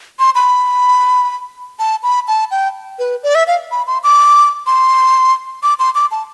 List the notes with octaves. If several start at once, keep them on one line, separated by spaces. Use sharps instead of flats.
C6
B5
A5
B5
A5
G5
B4
D5
E5
F5
B5
C6
D6
C6
D6
C6
D6
A5